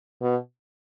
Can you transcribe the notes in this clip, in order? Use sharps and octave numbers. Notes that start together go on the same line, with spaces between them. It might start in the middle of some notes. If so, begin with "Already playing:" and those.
B2